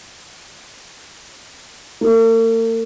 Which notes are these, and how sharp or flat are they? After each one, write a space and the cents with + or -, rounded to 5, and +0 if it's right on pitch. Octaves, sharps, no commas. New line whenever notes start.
A#3 -45